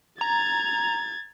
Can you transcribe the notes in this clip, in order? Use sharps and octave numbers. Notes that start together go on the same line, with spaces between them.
A#5 G#6 A6